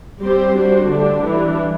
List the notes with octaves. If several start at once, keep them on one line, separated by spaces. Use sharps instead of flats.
G3 C4 G4 C5
G3 D4 F#4 C5
D3 A3 D4 G4
E3 G3 D4